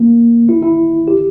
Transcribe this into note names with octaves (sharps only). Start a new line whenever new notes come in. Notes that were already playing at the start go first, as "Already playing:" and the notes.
Already playing: A#3
E4
E4
G4